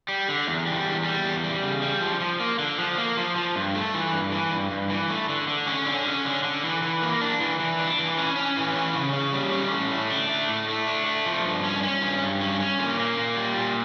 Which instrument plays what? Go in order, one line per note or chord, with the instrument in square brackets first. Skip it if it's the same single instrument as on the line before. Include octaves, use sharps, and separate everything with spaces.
[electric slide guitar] G3
D3
E2
G3
E2
G3
E2
G3
C#3
G3
F3
F3
A#3
D3
F3
A#3
F3
F3
G2
A3
E3
G2
E3
G2
G2
E3
A3
D3
D3
C#4
D3
C#4
D3
D3
E3
E3
A#3
D4
E3
E3
D4
E3
C#4
C#4
E3
C#4
C#3
C#4
G3
C#4
A2
A3
D4
A3
A2
A3
D4
A3
F3
G2
C#4
C#4
G2
G2
C#4
C#4
A#2
A#3
A#2
G3
A#2